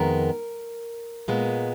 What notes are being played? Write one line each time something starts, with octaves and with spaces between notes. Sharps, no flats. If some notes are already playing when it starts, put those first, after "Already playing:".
Already playing: F2 D#3 G#3 B3 A#4
A#2 G#3 B3